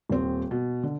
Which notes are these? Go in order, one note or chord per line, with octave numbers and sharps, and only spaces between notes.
D#1 C4
B2
D3